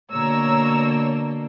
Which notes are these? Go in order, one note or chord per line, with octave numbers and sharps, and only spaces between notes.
B2 D3 A#3 C#5 A#5 E6